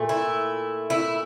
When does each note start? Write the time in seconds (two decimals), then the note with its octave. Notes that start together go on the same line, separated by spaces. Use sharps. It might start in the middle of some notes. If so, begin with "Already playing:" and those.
Already playing: A#2 A3
0.09 E4
0.90 E4